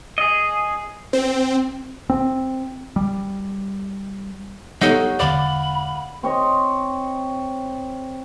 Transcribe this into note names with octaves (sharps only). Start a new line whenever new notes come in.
G#4 D#5
C4
C4
G3
G3 B3 D#4 G4 A4 C#5 F#5
E1 D3 D5 F5 F#5 B5
C4 C#5 D#5